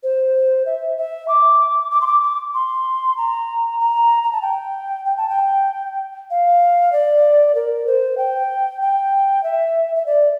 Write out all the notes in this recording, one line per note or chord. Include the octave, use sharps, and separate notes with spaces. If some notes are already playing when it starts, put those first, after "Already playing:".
C5
E5
E5
D6
D6
C6
D6
D6
C6
A#5
A#5
A#5
A5
G5
G5
A5
G5
F5
D5
A#4
C5
G5
G5
E5
E5
D5